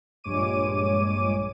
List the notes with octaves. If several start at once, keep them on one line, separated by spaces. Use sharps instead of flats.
A#1 G2 G#3 C#5 D6 D#7